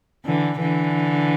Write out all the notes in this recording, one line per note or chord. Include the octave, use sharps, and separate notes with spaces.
D3 E3
D3 E3